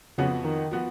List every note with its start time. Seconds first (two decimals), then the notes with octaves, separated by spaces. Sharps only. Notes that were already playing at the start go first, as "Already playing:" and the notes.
0.18 F2 C#3 F3 B3 F#4
0.44 D#3
0.71 F3 B3 F#4